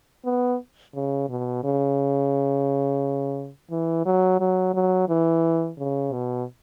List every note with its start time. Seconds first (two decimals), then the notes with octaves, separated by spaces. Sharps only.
0.25 B3
0.95 C#3
1.29 B2
1.64 C#3
3.71 E3
4.06 F#3
4.40 F#3
4.74 F#3
5.09 E3
5.78 C#3
6.13 B2